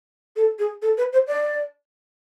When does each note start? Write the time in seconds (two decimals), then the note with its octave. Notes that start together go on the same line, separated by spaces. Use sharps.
0.36 A4
0.59 G#4
0.82 A4
0.98 B4
1.13 C5
1.28 D5